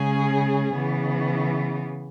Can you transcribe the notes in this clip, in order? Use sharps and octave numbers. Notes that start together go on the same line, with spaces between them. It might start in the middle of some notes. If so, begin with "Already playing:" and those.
Already playing: C#3 G#3 C#4 G#4
C#3 E3 B3